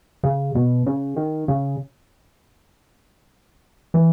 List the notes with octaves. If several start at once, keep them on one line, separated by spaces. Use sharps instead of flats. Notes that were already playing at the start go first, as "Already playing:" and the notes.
C#3
B2
C#3
D#3
C#3
E3